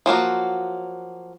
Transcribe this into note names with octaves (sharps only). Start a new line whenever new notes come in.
F3 F#3 A#3 F#4